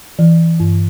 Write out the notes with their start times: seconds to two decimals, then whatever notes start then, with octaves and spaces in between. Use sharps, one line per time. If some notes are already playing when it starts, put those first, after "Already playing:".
0.19 E3
0.60 G2